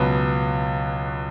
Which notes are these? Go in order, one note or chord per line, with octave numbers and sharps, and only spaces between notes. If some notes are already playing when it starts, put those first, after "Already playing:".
Already playing: C#2 B2 F#3 B3